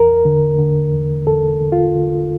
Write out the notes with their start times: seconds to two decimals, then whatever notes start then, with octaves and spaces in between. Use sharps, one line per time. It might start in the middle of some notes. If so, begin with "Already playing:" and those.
Already playing: E2 A#4
0.25 D3
0.59 D3
0.93 E2
1.27 E2 A4
1.61 D3
1.72 F4
1.95 D3